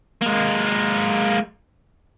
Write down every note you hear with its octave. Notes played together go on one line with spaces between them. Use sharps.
G#3 A#3